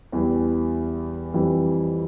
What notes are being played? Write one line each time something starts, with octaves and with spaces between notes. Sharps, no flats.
E2 E3 G3
F2 E3 G3